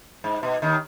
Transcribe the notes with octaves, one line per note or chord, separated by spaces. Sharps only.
G#2
B2
D#2 D#3